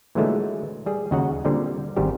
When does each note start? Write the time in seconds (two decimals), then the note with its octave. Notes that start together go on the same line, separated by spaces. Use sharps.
0.15 A#2 D3 E3 F#3 G#3 A3
0.86 G3 G#4
1.11 D#2 C#3 F#4 D#5 F#5 A#5
1.45 A#2 D3 G3 C4
1.96 G#1 G#2 C3 G3 G4